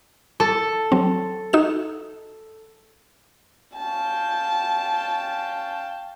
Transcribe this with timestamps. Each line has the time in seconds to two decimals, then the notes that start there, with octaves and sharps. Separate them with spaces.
0.40 A4
0.92 F#3 C4
1.53 D#4 F#4 E7
3.76 C#4 F5 G5 A5